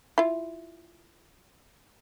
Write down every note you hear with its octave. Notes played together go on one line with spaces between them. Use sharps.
E4 F4